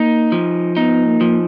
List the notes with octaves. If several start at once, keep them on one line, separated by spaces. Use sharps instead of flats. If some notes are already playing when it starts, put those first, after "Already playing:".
Already playing: A#3 D#4
F3
B3 D#4
A#3
F3